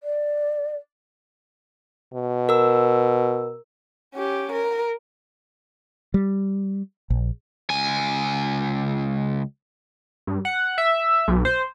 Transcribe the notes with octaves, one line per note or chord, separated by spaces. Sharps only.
D5
B2
A#4 E6
C#4 G4
A#4
G3
A#1
C#2 G#5
G2
F#5
E5
B1
C5